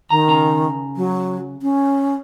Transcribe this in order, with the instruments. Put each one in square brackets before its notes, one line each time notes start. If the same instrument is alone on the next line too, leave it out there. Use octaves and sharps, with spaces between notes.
[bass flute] D#3 [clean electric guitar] A#5
[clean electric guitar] C#3 A#5
[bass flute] F#3
C#4